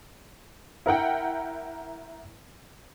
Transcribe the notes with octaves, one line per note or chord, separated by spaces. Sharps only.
E4 A#4 F#5 G5